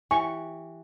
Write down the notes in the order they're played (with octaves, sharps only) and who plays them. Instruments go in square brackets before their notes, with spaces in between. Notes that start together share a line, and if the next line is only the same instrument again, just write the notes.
[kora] E3 G4 [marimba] G#5 [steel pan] C#6